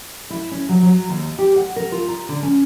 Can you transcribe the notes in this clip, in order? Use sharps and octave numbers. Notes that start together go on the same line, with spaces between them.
E4
C#4
F#3
F#3
D#2
G4
F#5
A#4
F4
A#5
D3
C#4